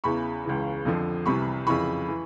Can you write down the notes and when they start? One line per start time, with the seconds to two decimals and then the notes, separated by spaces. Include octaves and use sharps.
0.04 E2 C#3 E3 B5 C#6
0.44 C#2 C#3 E3
0.85 F2 D3 F3
1.26 C2 C3 E3 B5 C#6
1.66 F2 C#3 E3 B5 C#6
2.08 E3